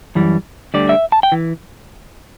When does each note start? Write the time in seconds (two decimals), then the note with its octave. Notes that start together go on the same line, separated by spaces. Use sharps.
0.15 F#2 E3 G3
0.74 D2 D3 G3 D5
0.89 E5
1.12 A5
1.23 G5
1.32 E3